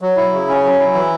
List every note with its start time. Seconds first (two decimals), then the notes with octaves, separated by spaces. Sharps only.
0.01 F#3
0.17 E4
0.32 C#3
0.49 C#4
0.64 F#3
0.80 E4
0.95 E3